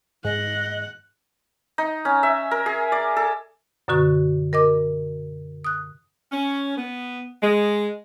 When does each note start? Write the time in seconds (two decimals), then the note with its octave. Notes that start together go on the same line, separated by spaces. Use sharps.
0.25 G#2 D#5 F#5
1.78 D#4
2.05 C#4
2.23 E5
2.51 A#4
2.66 G#4
2.92 D5
3.17 A4
3.88 F#2 B2 D3 F#4 C#6
4.53 A#4 D#5 D6
5.65 D#6 F#6
6.32 C#4
6.77 B3
7.42 G#3